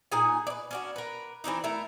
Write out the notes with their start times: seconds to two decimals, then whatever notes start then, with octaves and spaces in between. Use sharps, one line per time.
0.12 A#2 D#4 G#4 G#5
0.47 B4 D5
0.71 C#4 D4 F#4
0.96 A#4 B4
1.44 E3 C4 D4 D#4
1.64 A3 E4 A#4